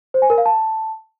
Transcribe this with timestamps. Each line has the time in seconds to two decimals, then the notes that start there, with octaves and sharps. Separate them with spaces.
0.14 C5
0.22 G#5
0.30 A#4
0.38 F5
0.46 A5